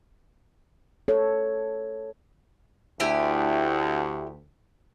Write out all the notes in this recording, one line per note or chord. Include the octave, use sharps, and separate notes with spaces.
A4 C#5
D2 E4 G4 G#5